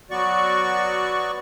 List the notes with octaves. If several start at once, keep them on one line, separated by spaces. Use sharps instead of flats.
F#3 B3 F#4 D5 C#6